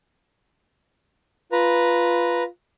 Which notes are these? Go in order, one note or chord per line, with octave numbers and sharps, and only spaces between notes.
F4 B4 A#5